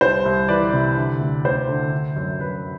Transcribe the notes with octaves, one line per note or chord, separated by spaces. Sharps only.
C2 C5
C2
E3 B4 D5
C3
D3
D2
D2 C5
D3
D3
F#2
F#2 B4